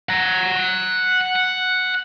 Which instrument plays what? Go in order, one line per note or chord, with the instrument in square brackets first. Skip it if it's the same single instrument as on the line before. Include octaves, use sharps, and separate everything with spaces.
[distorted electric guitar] F#5 A#5